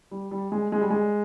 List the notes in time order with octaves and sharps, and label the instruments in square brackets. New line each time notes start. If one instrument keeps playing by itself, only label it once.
[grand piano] G3
G3
G#3
G#3
G3
G#3